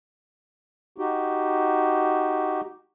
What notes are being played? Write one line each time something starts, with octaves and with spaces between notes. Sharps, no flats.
D#4 F#4 G4